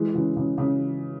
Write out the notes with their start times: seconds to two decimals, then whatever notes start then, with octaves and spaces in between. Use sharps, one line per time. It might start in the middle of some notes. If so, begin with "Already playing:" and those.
Already playing: E3 G#3
0.14 C#3 E3
0.37 C#3
0.58 C#3